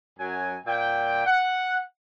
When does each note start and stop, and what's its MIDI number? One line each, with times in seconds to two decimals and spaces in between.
0.19 0.55 42
0.19 0.55 54
0.19 0.55 80
0.66 1.26 46
0.66 1.26 79
1.26 1.78 78